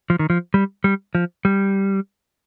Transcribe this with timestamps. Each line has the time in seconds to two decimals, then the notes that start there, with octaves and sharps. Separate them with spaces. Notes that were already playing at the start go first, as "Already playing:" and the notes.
0.10 F3
0.19 D#3
0.30 F3
0.54 G3
0.84 G3
1.15 F3
1.45 G3